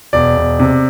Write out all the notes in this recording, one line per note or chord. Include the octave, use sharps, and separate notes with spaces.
E1 D5
E1
C3